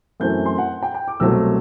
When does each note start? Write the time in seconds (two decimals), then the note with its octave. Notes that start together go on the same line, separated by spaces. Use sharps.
0.20 F#2 E3 A3 C4 G6
0.45 C6
0.58 F#5
0.83 G5
0.94 G5
1.08 D6
1.20 C2 B2 F#3 A3 C4 E6